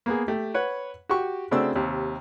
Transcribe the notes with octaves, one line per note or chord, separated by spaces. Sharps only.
A#3 B3 G#4
A3 G4
B4 C#5 F#5
F#4 G4 C#6
C#3 A3 C4 D4 F#4 E6
D#2 C3